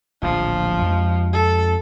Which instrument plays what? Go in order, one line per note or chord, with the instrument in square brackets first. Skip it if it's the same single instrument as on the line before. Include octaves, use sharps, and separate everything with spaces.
[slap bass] D1 A#1 [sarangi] F3
[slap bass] F2 G#3
[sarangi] A4